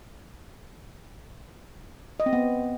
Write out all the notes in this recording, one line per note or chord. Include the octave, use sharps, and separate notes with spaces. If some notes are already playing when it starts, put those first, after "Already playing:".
D#5
C4
B3